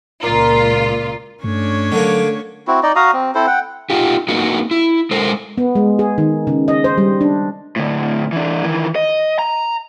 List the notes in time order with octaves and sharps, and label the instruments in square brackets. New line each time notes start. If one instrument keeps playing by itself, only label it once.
[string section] C#2 A#2 F4 [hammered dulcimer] A#4 D5
[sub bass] G2 [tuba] A3 [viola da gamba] C#4 D4 C#5
[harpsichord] D3 A#3 [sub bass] F#3
[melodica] C4 E4 F#4
D#4 D5 D#5
F#4 F5 A#5 D#6
C4
C4 E4 A4 C5
F#5 G5
[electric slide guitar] D#4 F4 G4
A#3 B3 D#4 F#4
E4
G#3 A4 A#4 C5
[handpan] B3
G#3
G#4
D#3
C#3
D#5
C5
G3
D4
[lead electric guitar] A2 D3
E3 D4
D#3 E3
D#5
A#5